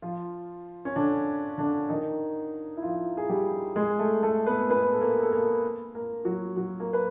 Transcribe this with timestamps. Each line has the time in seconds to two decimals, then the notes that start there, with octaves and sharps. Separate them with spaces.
0.02 F3 F4
0.85 C#4
0.96 D3 D4
1.58 D3 D4
1.89 D#3 D#4
2.77 E4
2.82 F3 F4
3.17 G#4
3.29 G3 G4
3.76 G#3 G#4
3.99 A3 A4
4.23 A3 A4
4.46 B3 B4
4.69 B3 B4
4.93 A4
5.01 A#3 A#4
5.22 A4
5.32 A#3 A#4
5.95 A#3 A#4
6.25 F#3 F#4
6.56 F#3 F#4
6.79 A#3 A#4
6.93 B4